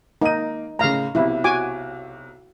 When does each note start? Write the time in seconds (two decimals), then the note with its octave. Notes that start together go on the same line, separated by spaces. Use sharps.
0.22 A#3 D#4 D#7
0.79 A2 C#3 F5 A#5
1.15 B1 C3 E4
1.44 F#4 G#5 D6